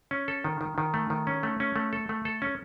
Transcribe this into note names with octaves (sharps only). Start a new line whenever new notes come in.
C#4
A4
D#3
D#3
D#3
A3
D#3
C#4
A3
C#4
A3
A4
A3
A4
C#4